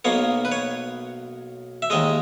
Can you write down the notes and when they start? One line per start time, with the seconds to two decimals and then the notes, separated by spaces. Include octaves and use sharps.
0.05 B1 B2 A#3 C#5
0.45 B4
0.52 C#5
1.82 E5
1.90 D#2 D#3 G#3 D#5